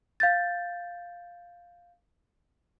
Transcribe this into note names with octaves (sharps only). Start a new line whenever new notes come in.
F5 G6 A6